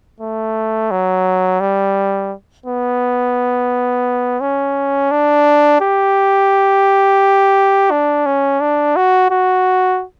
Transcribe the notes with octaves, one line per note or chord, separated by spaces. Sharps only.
A3
F#3
G3
B3
C#4
D4
G4
D4
C#4
D4
F#4
F#4